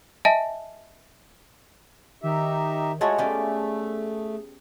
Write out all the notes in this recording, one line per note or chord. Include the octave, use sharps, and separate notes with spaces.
D#5 E5 G#5 A5
D#3 D#4 G4 E5
G#3 A3 F4 F#4 G#4 A4 C#5 A6
A3 B3 C#4 G4 G#4 D5